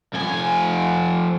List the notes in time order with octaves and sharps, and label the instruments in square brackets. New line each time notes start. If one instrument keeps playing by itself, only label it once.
[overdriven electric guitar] F2 G#5